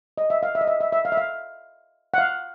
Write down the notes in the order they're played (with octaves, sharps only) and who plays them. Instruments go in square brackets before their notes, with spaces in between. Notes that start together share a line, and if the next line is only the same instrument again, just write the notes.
[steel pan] D#5
E5
F5
E5
D#5
E5
E5
E5
F5
E5
F5
F#5
F5